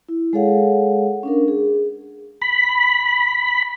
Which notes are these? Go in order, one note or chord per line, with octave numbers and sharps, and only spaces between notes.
E4
G#3 G#4 A4 C#5 F5 F#5
C#4 D4 A#4
G#4
B5